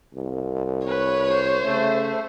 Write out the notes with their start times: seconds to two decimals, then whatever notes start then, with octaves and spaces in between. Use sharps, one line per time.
0.15 C2
0.88 B4 C#5
1.32 C5
1.63 C#3 A3